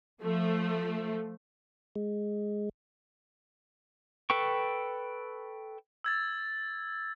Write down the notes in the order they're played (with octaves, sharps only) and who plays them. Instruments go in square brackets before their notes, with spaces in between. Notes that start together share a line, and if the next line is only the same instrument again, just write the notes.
[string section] F3 A3
[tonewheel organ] G#3
[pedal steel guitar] A4 B4 G5 C#6
[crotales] E6 G#6 A6